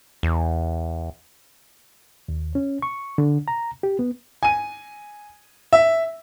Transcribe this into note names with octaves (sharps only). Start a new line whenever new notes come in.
E2
D#2
C#4
C#6
D3
A#5
G4
B3
G#5 D#7
E5